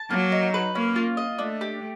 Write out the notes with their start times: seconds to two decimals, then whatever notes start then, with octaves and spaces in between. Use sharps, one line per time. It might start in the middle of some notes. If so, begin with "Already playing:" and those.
Already playing: A5
0.10 F#3 A#3
0.32 D#4
0.54 B4
0.75 A#3 C#4
0.96 F4
1.17 D#5
1.39 A3 D4
1.61 G4